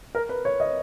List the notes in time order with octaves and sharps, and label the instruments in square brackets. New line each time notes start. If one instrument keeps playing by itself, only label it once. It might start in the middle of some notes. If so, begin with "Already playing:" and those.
[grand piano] A#4
B4
C#5
D#5